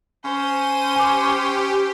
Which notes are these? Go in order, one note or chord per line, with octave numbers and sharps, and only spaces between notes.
C#4 C5 D#7
G4 G#5 D6